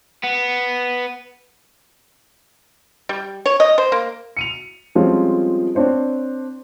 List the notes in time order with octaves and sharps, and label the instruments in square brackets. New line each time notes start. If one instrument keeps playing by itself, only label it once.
[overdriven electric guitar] B3
[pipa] G3
C#5
D#5
C5
A#3
[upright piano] C#7 D#7 F7
F3 G3 G#3 C4 C#4 F4
C4 D4 C5 C#5